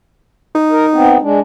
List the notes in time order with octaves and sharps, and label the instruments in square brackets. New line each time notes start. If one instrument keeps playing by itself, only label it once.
[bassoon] D#4
[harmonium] A#4
B3 C4
G#3 D4